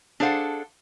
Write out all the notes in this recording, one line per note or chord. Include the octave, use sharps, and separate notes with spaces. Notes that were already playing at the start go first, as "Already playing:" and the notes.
D4 G#4 A4 C5 F5 F#5